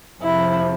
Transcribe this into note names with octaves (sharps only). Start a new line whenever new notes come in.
F2 C3 F3 E4